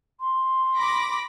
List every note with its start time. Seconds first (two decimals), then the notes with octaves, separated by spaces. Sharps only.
0.20 C6
0.76 B5 D6 A#6